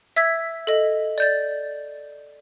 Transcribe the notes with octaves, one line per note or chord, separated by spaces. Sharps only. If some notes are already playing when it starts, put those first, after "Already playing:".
E5 E6 G#6 B6
A4 D#5
D5 G6 A6